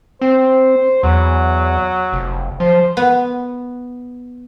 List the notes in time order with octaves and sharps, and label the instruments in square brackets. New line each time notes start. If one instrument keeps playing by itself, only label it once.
[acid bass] C4 [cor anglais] C5
[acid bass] E2 [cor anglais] F#3
[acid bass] F1
[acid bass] F3 [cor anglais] C5
[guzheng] B3